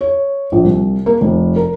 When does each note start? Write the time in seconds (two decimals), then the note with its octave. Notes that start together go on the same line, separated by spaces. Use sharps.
0.01 C#5
0.52 A#1
0.64 C2
1.06 A#3
1.21 F1
1.56 A#4